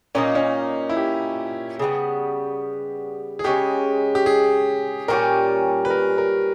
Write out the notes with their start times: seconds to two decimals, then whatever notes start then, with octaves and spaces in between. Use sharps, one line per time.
0.15 A#2 A#3 C#4 D#4
0.35 C#4
0.89 E4
0.97 G4
1.79 C#3 G3 B3
3.39 G#4
3.44 C#3 G#3 C#4 G4
4.15 G4
4.26 G#4
5.08 A#2 G3 C#4 G4 A#4
5.85 B4
5.90 A#4
6.18 A#4